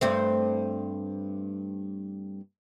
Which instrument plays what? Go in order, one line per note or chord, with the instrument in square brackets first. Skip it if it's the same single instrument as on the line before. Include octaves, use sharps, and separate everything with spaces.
[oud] G2 A3 C4